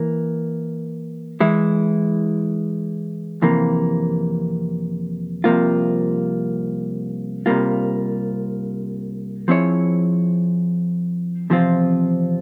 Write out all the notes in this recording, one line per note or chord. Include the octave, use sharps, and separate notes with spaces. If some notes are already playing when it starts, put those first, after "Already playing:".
Already playing: E3 A#3
E3 G#3 E4
F2 C3 E3 A#3
C2 C3 F3 A#3 F4
C2 C3 G3 A#3 F4
F3 C4 E4 G#4 C#5
E2 C3 F3 C4 F4